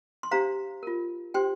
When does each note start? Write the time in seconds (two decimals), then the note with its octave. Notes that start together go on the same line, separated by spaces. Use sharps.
0.23 C6
0.31 D4 G4 C5 F5 A#5
0.83 F4 A#4
1.34 D4 G4 C5 G5 C6